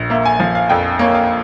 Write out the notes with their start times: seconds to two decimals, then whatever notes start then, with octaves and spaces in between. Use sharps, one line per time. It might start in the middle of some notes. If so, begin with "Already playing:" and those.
Already playing: A#1
0.10 A#3 E5
0.25 G#5
0.40 F3 F5
0.55 F5
0.70 F2 G5
0.99 A#3 C#5
1.15 F5